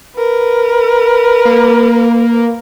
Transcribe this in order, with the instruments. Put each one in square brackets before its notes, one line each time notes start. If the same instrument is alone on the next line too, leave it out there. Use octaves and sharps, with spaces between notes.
[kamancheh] A#4 B4
[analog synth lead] A#3